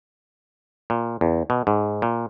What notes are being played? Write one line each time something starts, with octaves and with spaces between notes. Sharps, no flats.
A#2
E2
B2
G#2
A#2